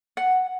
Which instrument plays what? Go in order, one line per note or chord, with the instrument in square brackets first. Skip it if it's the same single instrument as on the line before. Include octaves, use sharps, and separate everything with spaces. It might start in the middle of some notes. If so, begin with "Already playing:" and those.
[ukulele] F#5